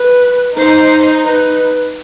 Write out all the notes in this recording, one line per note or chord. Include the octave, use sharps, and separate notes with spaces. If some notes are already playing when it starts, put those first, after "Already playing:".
Already playing: B4
D#4 C5
B4